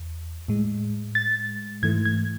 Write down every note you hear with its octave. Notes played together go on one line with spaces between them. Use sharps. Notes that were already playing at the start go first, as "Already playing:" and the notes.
Already playing: E2
A2 G#3
A6
G#2 E3 A3 G#6
G#6